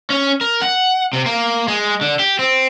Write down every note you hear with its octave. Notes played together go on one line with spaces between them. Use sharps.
C#4
A#4
F#5
C3
A#3
G#3
D3
G4
C4